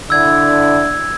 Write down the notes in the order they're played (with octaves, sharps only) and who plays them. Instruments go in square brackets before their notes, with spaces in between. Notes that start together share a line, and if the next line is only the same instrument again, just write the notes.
[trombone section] D3 E4 [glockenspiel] E6 G#6